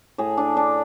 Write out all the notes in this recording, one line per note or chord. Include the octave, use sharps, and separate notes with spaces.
A2 G#4
D4
D4